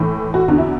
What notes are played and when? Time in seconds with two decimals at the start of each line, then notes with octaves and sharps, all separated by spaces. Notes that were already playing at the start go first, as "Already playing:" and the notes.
Already playing: A2 E3
0.34 F#4
0.48 E2 D3 F#4
0.58 E4